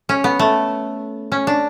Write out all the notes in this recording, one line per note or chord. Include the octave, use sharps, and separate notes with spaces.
C#4
B3
A3
C#4
D4